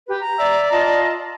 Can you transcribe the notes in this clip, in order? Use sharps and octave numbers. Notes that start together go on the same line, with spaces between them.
G4 B4
A#5
D5 E5
F4 D#5 A5 A#5